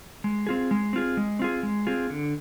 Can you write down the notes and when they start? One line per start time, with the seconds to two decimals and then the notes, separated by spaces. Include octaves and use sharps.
0.24 G#3
0.47 C4 F4 G#4
0.71 G#3
0.93 C4 F4 G#4
1.17 G#3
1.39 C4 F4 G#4
1.63 G#3
1.87 C4 F4 G#4
2.10 D3